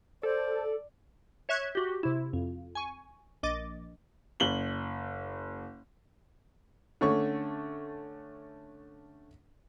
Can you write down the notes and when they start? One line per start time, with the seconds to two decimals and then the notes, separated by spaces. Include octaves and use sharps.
0.23 A4 C5 D5
1.49 C#5 E5 C#6 F#6 G#6
1.75 F#4 G4
2.03 C3 E4
2.33 F2
2.75 G#5 C#6
3.43 A#1 D#5 D6 A6
4.40 F#1 F#7 G7
7.01 D3 A3 C#4 C#6